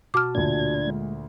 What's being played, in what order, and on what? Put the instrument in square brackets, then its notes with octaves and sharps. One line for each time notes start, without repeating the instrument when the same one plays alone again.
[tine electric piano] B2 F#4 A5 [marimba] D6 F6
[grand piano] D2 A#2 [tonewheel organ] D4 G#6
[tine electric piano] G#3